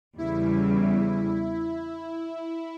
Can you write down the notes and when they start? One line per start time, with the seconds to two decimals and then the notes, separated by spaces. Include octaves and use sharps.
0.18 E2 C#3 G3 E4